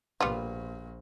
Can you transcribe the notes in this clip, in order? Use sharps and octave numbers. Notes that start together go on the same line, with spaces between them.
A#1 A#2 G3 B3 F4